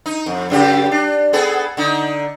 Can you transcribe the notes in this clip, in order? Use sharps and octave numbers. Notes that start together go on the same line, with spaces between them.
D#4
F2
F#2 C#3 G4
D4
B3 G#4 A4
D3 D#4